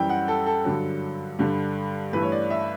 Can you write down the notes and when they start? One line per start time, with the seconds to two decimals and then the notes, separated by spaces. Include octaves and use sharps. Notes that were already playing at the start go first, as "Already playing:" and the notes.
Already playing: F#2 E3 G3 G5
0.09 F#5
0.28 A4
0.46 A4
0.65 G2 D3 F#3
1.39 G2 D3 G3
2.13 G2 E3 A3 B4
2.22 C#5
2.32 D5
2.50 E5